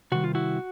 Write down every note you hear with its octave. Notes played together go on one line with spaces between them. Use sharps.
C3 D#3 G3 F#4
F4
E4 F#4